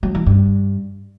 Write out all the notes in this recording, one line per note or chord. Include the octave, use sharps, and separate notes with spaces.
F#3
E3
G2